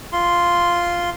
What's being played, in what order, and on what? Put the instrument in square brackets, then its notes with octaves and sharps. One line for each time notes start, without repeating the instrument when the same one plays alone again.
[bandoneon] F4 C6